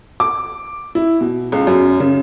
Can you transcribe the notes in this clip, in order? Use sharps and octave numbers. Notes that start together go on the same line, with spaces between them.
D6
E4
B2
C#2
F#2
C#3